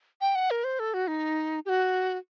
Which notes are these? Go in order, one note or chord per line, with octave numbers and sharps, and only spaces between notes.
G5
F#5
A#4
C5
A4
F#4
D#4
G4
F#4